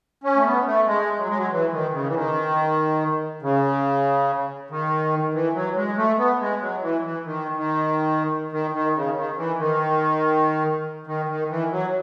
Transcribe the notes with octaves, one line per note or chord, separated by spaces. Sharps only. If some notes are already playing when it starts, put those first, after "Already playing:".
C#4
A3
B3
A3
G#3
F#3
G#3
F#3
E3
D#3
C#3
E3
D#3
C#3
D#3
E3
F#3
G#3
A3
B3
G#3
F#3
E3
E3
D#3
D#3
D#3
D#3
C#3
D#3
E3
D#3
D#3
D#3
E3
F#3